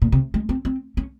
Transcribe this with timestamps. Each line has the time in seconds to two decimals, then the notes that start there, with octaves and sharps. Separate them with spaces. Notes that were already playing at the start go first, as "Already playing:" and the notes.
0.02 A#2
0.12 C3
0.34 G#3
0.49 C4
0.65 C4
0.97 C#4